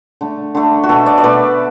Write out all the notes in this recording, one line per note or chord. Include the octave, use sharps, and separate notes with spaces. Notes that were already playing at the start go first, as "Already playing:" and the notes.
D3 A3
D3 A3
F#4
B2 A3 A4
D5
D5
B2 A3 B4